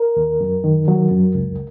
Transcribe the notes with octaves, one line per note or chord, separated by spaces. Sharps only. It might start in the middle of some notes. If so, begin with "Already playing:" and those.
Already playing: A#4
D#2
F#2
D#3
F#3
F#2
C#2